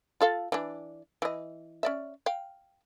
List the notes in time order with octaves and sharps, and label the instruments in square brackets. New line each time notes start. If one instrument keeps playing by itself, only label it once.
[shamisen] F4 A4 F5
E3 D4
E3 D#5
C#4 D5 E5
F5 G5